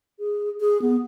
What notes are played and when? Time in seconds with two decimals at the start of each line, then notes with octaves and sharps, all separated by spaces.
0.20 G#4
0.60 G#4
0.82 B3